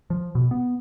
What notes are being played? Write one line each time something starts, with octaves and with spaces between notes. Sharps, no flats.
F3
B2
B3